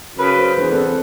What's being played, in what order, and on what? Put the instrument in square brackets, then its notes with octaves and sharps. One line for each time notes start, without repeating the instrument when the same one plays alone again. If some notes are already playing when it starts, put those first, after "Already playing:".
[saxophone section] F#2 C#3 B4
[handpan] C5
[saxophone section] E2 [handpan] D4 B4
[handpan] C4 A4